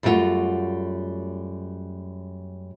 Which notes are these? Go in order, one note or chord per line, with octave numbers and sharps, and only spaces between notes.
F#2 G3 A3 C4 F4 F#4